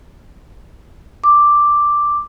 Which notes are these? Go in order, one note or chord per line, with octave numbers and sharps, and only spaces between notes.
D6